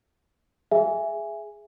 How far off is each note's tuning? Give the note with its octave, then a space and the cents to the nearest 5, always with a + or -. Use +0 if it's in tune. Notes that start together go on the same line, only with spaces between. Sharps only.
G#4 +0 E5 +15 G#5 -5